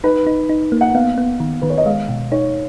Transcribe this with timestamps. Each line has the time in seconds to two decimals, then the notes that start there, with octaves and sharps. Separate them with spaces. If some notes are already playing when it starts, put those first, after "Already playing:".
0.04 D#4 B4
0.27 D#4
0.49 D#4
0.72 A#3
0.81 F#5
0.95 B3 F5
1.18 B3
1.40 D#3
1.62 D#3 B4
1.70 C#5
1.78 D#5
1.86 G#3 F5
2.09 B2
2.32 D#4 C#5